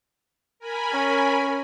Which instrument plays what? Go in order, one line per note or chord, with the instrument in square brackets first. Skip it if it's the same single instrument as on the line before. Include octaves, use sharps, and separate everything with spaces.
[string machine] A#4 G#5 B5
[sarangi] C#4